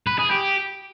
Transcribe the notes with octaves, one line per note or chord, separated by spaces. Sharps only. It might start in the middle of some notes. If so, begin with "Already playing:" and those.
B4
G#4
G4